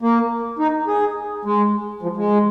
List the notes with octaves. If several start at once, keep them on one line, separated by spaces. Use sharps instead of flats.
A#3
D#4
G#4
G#3
F3
G#3